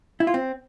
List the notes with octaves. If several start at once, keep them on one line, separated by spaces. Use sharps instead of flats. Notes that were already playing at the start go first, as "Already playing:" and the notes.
E4
F4
C4